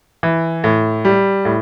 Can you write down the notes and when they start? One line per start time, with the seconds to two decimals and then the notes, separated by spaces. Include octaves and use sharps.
0.23 E3
0.64 A2
1.05 G3
1.45 A2